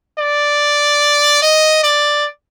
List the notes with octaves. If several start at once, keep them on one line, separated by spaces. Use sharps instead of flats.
D5
D#5
D5